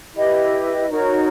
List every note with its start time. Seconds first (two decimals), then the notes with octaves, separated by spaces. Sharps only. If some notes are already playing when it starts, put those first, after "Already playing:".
0.14 E4 G4 B4 D#5
0.90 D#4 F#4 A#4 C#5